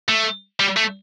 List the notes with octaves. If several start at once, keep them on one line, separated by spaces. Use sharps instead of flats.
A3
G3
A3